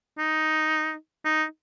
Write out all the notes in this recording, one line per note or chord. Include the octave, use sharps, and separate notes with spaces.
D#4
D#4